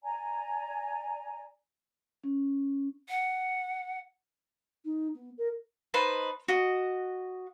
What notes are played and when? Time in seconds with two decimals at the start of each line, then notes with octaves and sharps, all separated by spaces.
0.04 D5 G#5 A#5
2.24 C#4
3.09 F#5
4.85 D#4
5.15 B3
5.38 A#4
5.94 D#4 B4 C5 A5
6.48 F#4 D#5